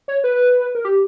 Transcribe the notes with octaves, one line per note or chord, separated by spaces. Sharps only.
C#5
B4
A#4
G4